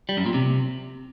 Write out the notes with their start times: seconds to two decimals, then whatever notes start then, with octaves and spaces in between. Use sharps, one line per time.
0.09 G3
0.17 F#2
0.26 A#2
0.34 C3